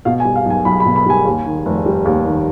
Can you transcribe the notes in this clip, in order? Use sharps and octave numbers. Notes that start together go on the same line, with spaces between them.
B2 F5
G#5
G3
F5
B1
G#5
B1 B5
B5
B2
B5
G3 G#5
D#2
D#3
F1
G3
D#2
D#3